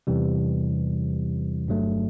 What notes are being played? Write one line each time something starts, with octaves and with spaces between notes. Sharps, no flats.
E2 C3 E3 G3
G1 G2 F#3 A3